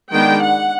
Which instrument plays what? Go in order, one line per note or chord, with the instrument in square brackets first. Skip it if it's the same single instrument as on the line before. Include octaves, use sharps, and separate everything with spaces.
[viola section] D#3 G#3 B3 D4 G5
F#5